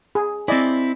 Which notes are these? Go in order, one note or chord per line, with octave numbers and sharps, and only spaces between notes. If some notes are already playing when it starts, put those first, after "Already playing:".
G#4
C4 E4 D5 D#5 G#5